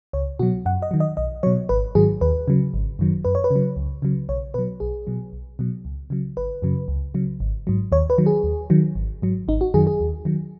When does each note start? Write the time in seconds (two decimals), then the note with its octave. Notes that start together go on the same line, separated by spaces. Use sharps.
0.13 C#2 C#5
0.39 B2 F#3 F#4
0.66 F#2 F#5
0.82 D#5
0.91 D#3 F#3
1.00 D#5
1.17 B1 D#5
1.43 B2 F#3 C#5
1.69 G#1 B4
1.95 G#2 D#3 F#3 G#4
2.21 D#2 B4
2.48 C#3 F#3
2.74 G#1
2.99 F#2 D#3 F#3
3.25 F#2 B4
3.35 C#5
3.44 B4
3.51 C#3 F#3
3.76 C#2
4.02 C#3 F#3
4.29 B1 C#5
4.54 B2 F#3 B4
4.80 B1 G#4
5.07 B2 F#3
5.33 B1
5.59 B2 F#3
5.85 C#2
6.10 C#3 F#3
6.37 G#1 B4
6.62 F#2 C#3 F#3
6.88 C#2
7.14 C#3 F#3
7.40 G#1
7.67 G#2 F#3
7.92 D#2 C#5
8.10 B4
8.18 D#3 F#3
8.26 G#4
8.44 D#2
8.70 D#3 F#3
8.95 G#1
9.22 G#2 F#3
9.48 G#1 D#4
9.61 F#4
9.74 F#2 D#3 F#3 G#4
9.87 G#4
10.00 D#2
10.25 D#3 F#3